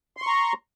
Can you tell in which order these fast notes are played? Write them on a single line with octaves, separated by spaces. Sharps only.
C6 C#6 A#5